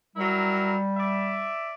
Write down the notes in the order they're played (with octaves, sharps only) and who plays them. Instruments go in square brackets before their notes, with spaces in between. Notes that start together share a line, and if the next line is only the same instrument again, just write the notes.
[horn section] F#3 E4 A#4 [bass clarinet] G3
[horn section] D5 E5